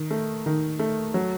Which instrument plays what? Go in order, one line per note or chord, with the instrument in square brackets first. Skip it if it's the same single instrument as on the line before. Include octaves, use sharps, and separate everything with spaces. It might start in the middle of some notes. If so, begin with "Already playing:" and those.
Already playing: [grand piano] D#3
A3
D#3
A3
F#3